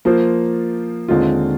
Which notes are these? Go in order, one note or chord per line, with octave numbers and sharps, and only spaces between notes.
F3 A#3 F4 C5
D#2 D3 G#3 C4 F4